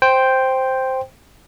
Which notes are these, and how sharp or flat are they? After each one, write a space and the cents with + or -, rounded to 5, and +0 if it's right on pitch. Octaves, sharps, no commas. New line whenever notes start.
C5 +0 G5 +0